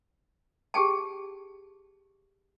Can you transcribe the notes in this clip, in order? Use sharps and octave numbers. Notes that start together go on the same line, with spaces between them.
G4 G#4 G5 A5